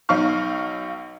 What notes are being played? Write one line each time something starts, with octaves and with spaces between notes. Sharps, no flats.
B1 D#4 F5 C#6 F6